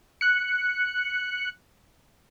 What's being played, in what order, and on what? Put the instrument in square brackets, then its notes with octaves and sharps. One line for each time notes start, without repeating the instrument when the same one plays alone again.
[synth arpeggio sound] F#6 C#7